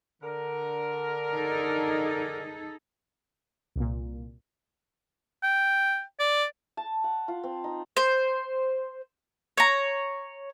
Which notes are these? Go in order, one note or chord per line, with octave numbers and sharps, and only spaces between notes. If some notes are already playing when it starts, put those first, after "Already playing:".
D3 A#4
D#4 G#4 A4
C2 A#2
G5
D5
A5
F#5
F4
C4
D#4
C5
C#5 A#5